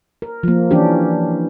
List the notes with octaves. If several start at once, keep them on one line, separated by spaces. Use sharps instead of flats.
A#4
F3 A#3
E3 C#4 D4 G4